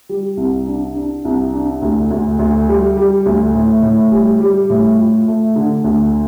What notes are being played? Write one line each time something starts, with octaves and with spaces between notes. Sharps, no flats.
G3
C2
D4
D4
C2
D4
D2
D2
D2
G3
G3
D2
A2
A2
G3
G3
A2
F4
A3
D3
D2